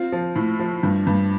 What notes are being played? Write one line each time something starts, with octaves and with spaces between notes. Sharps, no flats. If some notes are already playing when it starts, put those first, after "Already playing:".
Already playing: C4 F4
F3
A2
F3
G2
G2